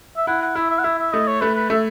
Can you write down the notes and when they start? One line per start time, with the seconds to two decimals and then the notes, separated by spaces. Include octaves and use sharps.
0.17 E5
0.27 E4 F#5
0.42 F#5
0.56 E4 E5
0.70 E5
0.79 F#5
0.84 E4 E5
0.99 E5
1.12 A3 D#5
1.27 C#5
1.41 A3 B4
1.55 B4
1.70 A3 E5